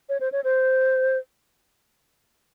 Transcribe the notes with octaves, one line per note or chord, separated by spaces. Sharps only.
C#5
C5
C#5
C5